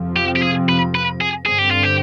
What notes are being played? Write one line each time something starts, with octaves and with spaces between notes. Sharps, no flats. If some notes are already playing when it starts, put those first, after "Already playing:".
Already playing: F2 C3 F3 C4
G4
G4
G#4
B4
B4
G#4
G2 D3 G3 C4 G#4
G4
F4
G4